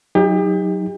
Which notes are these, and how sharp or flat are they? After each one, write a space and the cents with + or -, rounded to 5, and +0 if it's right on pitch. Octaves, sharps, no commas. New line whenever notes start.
F#3 +0 D#4 +20 G4 +35